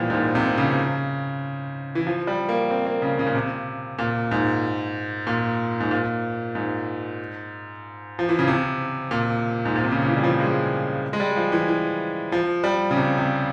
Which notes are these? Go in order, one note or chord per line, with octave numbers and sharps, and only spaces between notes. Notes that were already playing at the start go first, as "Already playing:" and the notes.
Already playing: A#2 E3 F3 G3
G#2
A#2
C3
C#3
E3
F3
G3
A#3
C4
A#3
C#3
C#3
A#2
C3
A#2
G#2
A#2
G#2
A#2
G#2
F3
E3
C#3
C3
A#2
G#2
A#2
C3
C#3
C#3
E3
G3
F3
G#3
G#3
G3
F3
E3
E3
F3
G3
C#3
C3
C3